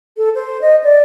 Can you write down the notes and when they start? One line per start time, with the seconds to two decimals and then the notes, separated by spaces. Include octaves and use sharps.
0.17 A4
0.35 C5
0.61 D#5
0.84 D5